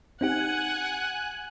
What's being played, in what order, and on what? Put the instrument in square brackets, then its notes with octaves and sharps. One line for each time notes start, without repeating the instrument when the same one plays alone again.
[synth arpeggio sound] C4 D#4 G4 [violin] F#5 [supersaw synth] G#5 F#6